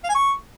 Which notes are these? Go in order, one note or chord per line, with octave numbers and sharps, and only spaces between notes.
F5
G#5
C#6